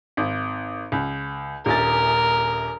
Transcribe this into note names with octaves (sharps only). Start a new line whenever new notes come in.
G#1
C#2
D#1 A#1 A#4 A6